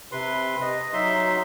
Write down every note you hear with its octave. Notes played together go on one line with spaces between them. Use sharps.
C3 B4 C6
D#5
F#3 D#4 E5 C6